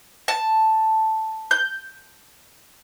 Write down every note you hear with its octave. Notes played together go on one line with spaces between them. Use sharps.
A5
G6